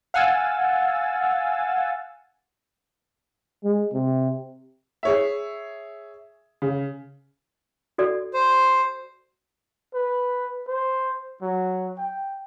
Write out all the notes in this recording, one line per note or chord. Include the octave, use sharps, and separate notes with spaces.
F5 F#5 G#5 E6 A6
G#3
C3
G#4 C#5 E5
C#3
F#4 A4 D5
C5
B4
C5
F#3
G5